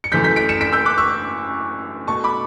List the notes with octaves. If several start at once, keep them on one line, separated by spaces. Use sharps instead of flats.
C#7
F#2 E3 A3 G6 B6
G6 B6
B6 D7
C#7 E7
B6 D7
E6 G6
D6 F#6
C#6 E6
B2 A3 A5 C#6
B5 D6